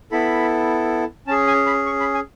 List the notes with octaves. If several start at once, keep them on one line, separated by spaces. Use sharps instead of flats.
B3 E4 A4 B5
C#4 G#4 A5
G#5
B5
C#6
B5
G#5